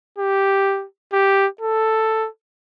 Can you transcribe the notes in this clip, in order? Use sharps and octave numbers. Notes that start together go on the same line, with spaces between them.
G4
G4
A4